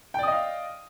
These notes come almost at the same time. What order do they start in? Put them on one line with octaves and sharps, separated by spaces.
G5 D5 D#6 D#5 F5